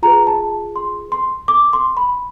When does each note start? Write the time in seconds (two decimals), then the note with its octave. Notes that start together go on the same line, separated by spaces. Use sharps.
0.03 F4 G#4 B4 A#5
0.27 A5
0.76 C6
1.12 C6
1.48 D6
1.73 C6
1.97 B5